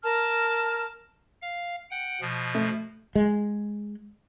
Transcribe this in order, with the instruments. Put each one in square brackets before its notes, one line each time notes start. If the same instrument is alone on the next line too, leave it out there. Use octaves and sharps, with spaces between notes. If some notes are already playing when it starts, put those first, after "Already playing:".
[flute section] A#4 A5 F6
[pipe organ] F5
F#5 G5
B2 F3
[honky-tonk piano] A3
[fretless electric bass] G#3